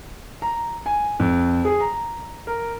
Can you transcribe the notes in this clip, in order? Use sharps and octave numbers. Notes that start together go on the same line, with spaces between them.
A#5
G#5
F2
G#4
A#5
A#4